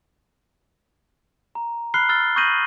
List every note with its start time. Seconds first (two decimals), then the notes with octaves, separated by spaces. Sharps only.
1.55 A#5
1.94 B5 F6 F#6 C7 G7
2.09 E6 F6 A6 G7
2.36 C#6 D#6 G6 A#6 D#7 F#7